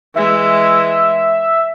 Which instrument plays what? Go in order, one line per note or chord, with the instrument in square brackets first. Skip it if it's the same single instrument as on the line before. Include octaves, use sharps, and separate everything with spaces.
[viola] E3 G#3 [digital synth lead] E5